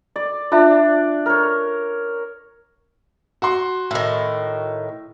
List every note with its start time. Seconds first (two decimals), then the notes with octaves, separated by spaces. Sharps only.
0.16 D5
0.52 D4 F4 E5
1.26 A#4 C#5
3.42 F#4 C6
3.91 A2 D#3